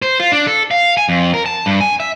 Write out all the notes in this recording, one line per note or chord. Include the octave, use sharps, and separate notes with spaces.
C5
F4
D4
A4
F5
G#5
F2
A#4
A5
G2
G#5
E5